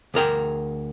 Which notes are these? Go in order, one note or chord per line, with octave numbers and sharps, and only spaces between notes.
D2 G#4 A#4 G5